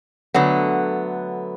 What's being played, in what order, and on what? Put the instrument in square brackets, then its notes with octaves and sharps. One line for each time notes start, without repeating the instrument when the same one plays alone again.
[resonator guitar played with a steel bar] D3 F#3 A3 B3